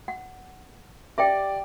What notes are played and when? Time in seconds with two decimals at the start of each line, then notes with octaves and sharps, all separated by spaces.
0.08 F#5
1.18 G4 D5 E5 G5 D6